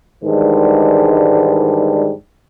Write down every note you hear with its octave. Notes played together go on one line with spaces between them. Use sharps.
G#2 D#3 E3 G3 G#3 D4